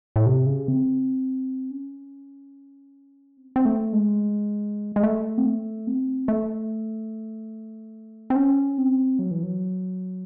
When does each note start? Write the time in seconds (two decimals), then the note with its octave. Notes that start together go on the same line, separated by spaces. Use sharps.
0.16 A2
0.26 C3
0.46 C#3
0.68 C4
1.71 C#4
3.37 C4
3.56 C4
3.65 A3
3.93 G#3
4.96 G#3
5.03 A3
5.38 C4
5.46 A3
5.87 C4
6.28 A3
8.30 C4
8.36 C#4
8.78 C4
9.19 F#3
9.31 E3
9.43 F#3